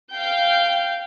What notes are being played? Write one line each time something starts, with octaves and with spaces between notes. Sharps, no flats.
F5 G5 G6